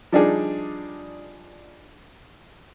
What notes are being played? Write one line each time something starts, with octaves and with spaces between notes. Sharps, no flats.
F3 G3 D4 D#4 G#4